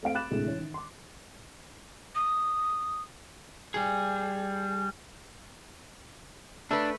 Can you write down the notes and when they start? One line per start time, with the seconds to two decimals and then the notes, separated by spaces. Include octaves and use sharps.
0.03 A3 C4 F5 D7
0.15 B5 D6 F#6 A6 E7
0.31 D2 A2 C3 G#3
0.45 E3 C#4
0.59 D#3
0.74 C6 D6
2.15 D#6
3.74 G3 G#4
6.71 A3 D4 B4